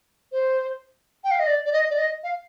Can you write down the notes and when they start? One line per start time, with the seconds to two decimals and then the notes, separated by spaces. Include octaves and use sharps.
0.32 C5
1.24 G5
1.31 F5
1.39 D#5
1.47 D5
1.66 D5
1.73 D#5
1.90 D5
1.98 D#5
2.23 F5